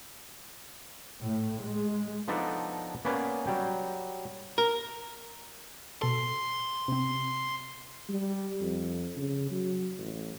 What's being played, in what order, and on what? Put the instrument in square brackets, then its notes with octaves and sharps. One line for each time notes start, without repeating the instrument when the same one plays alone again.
[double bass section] A2
G#3
[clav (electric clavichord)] F3 B3 D4 D#4 A4 D5
A#3 B3 C#4 B4 D5
F#3 G3 G5
[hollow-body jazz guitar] A#4
[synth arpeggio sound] B2 A4 [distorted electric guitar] C6
[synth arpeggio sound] C3 C4
[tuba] G3
F2
C#3
F#3
A1